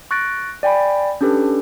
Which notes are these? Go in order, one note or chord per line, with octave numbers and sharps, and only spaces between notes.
C#6 F#6 A6 A#6 D7
D5 G5 G#5 B5
C#4 D4 G4 A4 B4